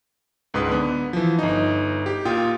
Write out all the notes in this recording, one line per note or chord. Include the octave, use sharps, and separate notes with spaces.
C#2 G#2 B4 D#6
D3 B3
E3 F3
G1 D#4
G4
A#2 F4 G5 D#6